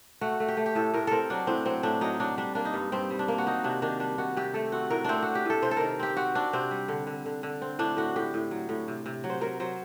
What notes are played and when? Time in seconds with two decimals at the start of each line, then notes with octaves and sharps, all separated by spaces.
0.21 A3 F#4
0.40 A3
0.48 G4
0.57 A3
0.66 G4
0.75 A2 A4
0.94 A2 A#4
1.07 C4 A4 A#4
1.30 F#3 D4
1.47 A2 C4
1.65 F#3 C4
1.83 A2 D4
2.01 F#3 D#4
2.20 F#3 D4
2.38 G3 D4
2.55 A#3 D4
2.65 D#4
2.74 G2
2.92 G2 C4
3.10 G3
3.19 D4
3.28 A#3
3.38 F#4
3.46 D#3 D#4
3.64 C3 D4
3.82 D#3 D4
4.00 G3 D4
4.18 D#3 F#4
4.37 C3 G4
4.54 A3 A4
4.72 C4 F#4
4.90 A2 A#4
5.04 A3 C4 D4
5.23 C4 F#4
5.35 G4
5.45 A2 A4
5.62 C3 C5
5.71 A4
5.77 D#3 A#4
5.99 C4 G4
6.17 C4 F#4
6.35 C4 D4
6.53 C3 C4
6.71 G3
6.88 D3
7.07 D3
7.26 D3
7.43 D3
7.62 C4
7.79 A2 D4
7.97 A2 F#4
8.16 A2 G4
8.34 A2
8.51 F#3
8.69 A2
8.88 C3
9.06 C3
9.24 F#3
9.30 C5
9.41 F#3 A#4
9.60 F#3 C5